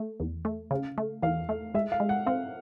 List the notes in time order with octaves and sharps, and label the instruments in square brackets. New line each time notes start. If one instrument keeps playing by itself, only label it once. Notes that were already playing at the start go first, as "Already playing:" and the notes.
Already playing: [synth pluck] A3
E2
A3
[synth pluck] C#3 [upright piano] F5
[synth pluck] A3
[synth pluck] E2 [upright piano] F5
[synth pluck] A3
[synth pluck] G#3 [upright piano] E5
[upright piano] F5
[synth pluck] G#3
[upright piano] F#5
[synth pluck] C4 [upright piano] F5